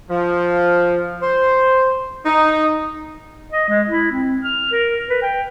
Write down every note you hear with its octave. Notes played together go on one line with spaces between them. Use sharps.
F3
C5
D#4
D#5
G#3
E4
C4
F6
A#4
B4
G5